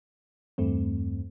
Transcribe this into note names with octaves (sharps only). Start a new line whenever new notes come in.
E2 G2 A3 C4